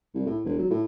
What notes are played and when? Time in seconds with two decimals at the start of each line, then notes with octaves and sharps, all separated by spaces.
0.14 C2
0.26 A2
0.45 E1
0.58 F#3
0.70 A2